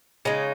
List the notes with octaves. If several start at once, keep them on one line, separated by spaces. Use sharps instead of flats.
C#3 G#3 D#4